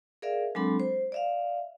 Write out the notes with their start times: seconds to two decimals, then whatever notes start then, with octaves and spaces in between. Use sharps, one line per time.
0.22 G#4 A#4 D5 E5 F5
0.55 F#3 G#3 C4 D4 A4 B5
0.80 C5
1.12 D5 E5 F5